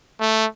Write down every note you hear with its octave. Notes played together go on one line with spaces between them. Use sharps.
A3